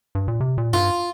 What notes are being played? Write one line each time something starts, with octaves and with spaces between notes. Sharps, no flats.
G2
A#2
C3
A#2
G2 F4